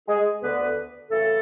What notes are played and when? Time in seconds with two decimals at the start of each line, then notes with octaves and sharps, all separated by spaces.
0.08 G#3 G#4
0.42 D2 D3 B3 B4
1.11 F#2 C#3 E3 A3 A4